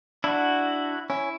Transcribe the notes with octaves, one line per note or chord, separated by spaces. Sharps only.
D4 E4 F#4
C#4 E4